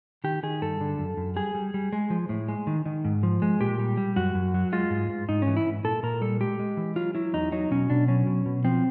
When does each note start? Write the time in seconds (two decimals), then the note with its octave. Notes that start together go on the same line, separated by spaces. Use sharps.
0.24 D#3 G4
0.43 D#3 G#4
0.62 G2 A4
0.81 D3
0.99 F#2
1.17 F#2
1.36 G3 G#4
1.55 G3
1.74 G3
1.93 G#3
2.10 F3
2.29 A2
2.48 G#3
2.67 D#3
2.86 D#3
3.05 G#2
3.23 F3
3.42 G#3
3.61 A#2 G4
3.80 G3
3.97 G3
4.16 F#2 F#4
4.35 F#2
4.54 F#3
4.72 G#3 F4
4.90 G#2
5.09 G#2
5.29 G#2 D#4
5.42 C#4
5.47 E3
5.57 E4
5.66 G#2
5.84 A#2 A4
6.03 A#2 A#4
6.21 G3 A4
6.41 G#3 G4
6.59 G#3
6.77 E3
6.96 F#3 F4
7.15 F#3 E4
7.33 E2 D#4
7.52 F#3 D#4
7.71 B2 C#4
7.90 B2 D4
8.08 F#3 C#4
8.27 B2
8.46 B2
8.64 F3 C4